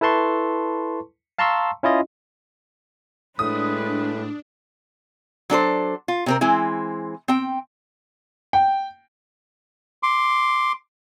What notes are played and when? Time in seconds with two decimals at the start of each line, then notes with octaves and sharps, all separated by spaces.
0.01 E4 A4 B4 A5 C6 C#6
1.38 F5 A5 A#5 C6 C#6 E6
1.83 C#4 E4 F4 D#5
3.39 A2 G#3 D4 B4 D#6
5.50 F#3 D4 A4 C5
6.08 F4
6.26 C3 C4 A#4
6.41 E3 G#3 C4 E4
7.28 C4 G5
8.53 G5
10.03 C6 D6